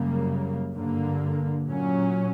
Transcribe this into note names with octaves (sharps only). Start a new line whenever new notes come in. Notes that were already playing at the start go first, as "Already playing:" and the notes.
Already playing: F#2 C#3 G3 A#3
G2 D3 A#3
A#2 F#3 C#4